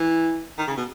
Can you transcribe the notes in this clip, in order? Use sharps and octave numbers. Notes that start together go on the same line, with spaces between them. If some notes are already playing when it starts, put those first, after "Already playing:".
Already playing: E3
D#3
C#3
B2